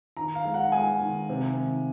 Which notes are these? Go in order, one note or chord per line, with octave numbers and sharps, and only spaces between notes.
D#3 A#5
F5
G#3
F#5
G#3 G#5
D#3
C3
D#3